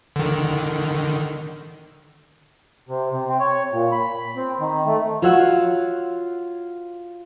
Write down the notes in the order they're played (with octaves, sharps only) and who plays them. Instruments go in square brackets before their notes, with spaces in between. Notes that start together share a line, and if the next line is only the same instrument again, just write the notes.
[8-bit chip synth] D3 D#3
[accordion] C3
C3
C4
C#5
A#2
B5
C4
D#3
A3
[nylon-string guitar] F4 F#4 C#5 E5 F#5